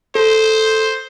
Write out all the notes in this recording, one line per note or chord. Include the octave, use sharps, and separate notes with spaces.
A4 C5